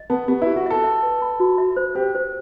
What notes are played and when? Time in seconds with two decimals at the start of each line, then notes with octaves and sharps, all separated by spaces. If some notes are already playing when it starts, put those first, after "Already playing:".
Already playing: D#5
0.10 B3 A5
0.28 B3 G4
0.42 E4
0.47 G4
0.56 F#4
0.66 A4 E5
0.84 E5
1.02 B4
1.22 B5
1.40 F#4
1.58 E5
1.77 C5
1.95 G4 C5
2.15 C5